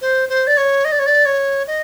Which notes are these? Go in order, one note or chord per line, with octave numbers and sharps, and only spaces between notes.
C5
C5
D5
C#5
D#5
D5
C#5
D5
C#5
D#5